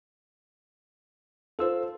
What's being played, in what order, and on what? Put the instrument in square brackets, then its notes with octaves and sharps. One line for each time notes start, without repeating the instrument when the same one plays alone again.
[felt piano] F4 C5 [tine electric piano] A4 E6